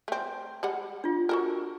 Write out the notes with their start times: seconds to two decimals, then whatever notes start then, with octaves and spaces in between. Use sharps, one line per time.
0.08 A3 C4
0.63 G3 G#3 F#5
1.04 D4 F4
1.29 F#4 A4 A#4